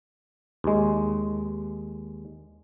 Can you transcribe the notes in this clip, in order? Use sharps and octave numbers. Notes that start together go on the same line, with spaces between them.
D#2 G#3